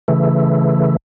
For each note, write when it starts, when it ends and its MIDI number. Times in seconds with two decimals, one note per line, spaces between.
0.08 0.97 49
0.08 0.97 52
0.08 0.97 57